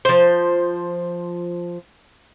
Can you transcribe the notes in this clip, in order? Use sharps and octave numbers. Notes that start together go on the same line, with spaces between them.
F3 C5